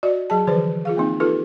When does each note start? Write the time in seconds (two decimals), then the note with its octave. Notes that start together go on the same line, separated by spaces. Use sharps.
0.03 F#4 D5 D#5
0.30 F#3 G#4 A5
0.47 D3 E3 F3 G#4 B4 C5
0.85 F4 G#4 F5
0.97 A#3 C4 D#4
1.20 D#4 F4 G4 A4 B4